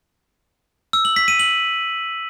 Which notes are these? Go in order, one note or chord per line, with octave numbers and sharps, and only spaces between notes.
E6
F#7
B6
D#7
F#7